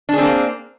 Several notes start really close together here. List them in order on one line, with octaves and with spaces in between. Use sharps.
D4 G#4 C4 A#3